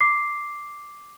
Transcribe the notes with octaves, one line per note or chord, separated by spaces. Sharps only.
D6 C7